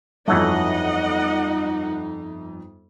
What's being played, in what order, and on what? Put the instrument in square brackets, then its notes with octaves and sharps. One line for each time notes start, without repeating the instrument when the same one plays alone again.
[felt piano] G1 F2 [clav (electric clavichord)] E3 F#3 A3 [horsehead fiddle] D#4 [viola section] D#5 F#5